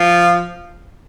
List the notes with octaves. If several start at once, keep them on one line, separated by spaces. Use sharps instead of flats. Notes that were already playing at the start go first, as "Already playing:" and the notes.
Already playing: F3 F4